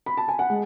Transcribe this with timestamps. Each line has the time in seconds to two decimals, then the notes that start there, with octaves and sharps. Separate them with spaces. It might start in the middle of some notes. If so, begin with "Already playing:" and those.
0.06 B5
0.17 A5
0.28 G#5
0.39 F#5
0.50 G#3